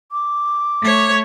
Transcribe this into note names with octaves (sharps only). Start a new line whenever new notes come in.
D6
A3 C#5